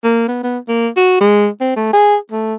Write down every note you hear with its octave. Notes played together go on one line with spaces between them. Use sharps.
A#3
B3
B3
A#3
F#4
G#3
C4
A3
G#4
A3